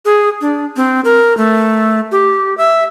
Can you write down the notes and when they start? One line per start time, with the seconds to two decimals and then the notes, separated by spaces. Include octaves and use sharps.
0.05 G#4
0.41 D4
0.77 C4
1.05 A#4
1.37 A3
2.12 G4
2.58 E5